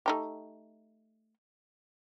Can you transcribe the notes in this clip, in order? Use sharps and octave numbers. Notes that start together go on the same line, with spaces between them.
A3 D#4 G4